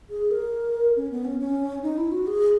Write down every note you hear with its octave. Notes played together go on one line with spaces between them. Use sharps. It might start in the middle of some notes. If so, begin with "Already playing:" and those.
G#4
A#4
C#4
B3
C#4
C#4
D#4
E4
F#4
G#4